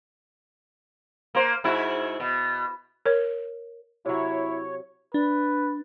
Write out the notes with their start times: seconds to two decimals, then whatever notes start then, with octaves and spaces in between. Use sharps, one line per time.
1.35 A#3 C5
1.64 G#2 E4 F#4
2.20 B2
3.06 A#4 C#5
4.06 C3 F#3 E4 C#5
5.14 D4 B4